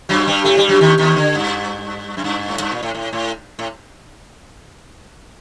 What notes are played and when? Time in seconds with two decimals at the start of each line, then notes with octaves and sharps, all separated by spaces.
0.09 F#2 F#3
0.27 G2 G3
0.45 A2 A3
0.57 G2 G3
0.69 F#2 F#3
0.81 D#2 D#3
0.98 D#2 D#3
1.16 D3
1.35 G2
2.17 F#2
2.24 G2
2.48 A2
2.60 G2
2.72 A#2
2.83 A2
2.95 A2
3.13 A2
3.59 A2